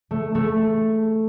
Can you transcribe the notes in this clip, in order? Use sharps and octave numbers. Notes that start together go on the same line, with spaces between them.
A3
A3